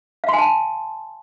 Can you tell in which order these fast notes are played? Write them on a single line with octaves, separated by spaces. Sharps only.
F5 C6 G#5 A5